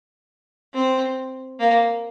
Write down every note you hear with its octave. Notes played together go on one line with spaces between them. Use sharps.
C4
A#3